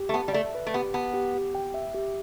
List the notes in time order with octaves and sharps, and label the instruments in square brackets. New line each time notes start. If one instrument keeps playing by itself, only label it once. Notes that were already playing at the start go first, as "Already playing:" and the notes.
Already playing: [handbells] G4
[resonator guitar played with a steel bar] A3
[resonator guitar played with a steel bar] B3 [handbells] A5
[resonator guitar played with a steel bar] G3
[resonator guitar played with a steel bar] A3 [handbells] E5
[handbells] B4
[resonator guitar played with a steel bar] A3
[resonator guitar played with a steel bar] B3 [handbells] G4
[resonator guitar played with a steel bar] B3 [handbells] A5
[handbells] G4
G4
G5
E5
G4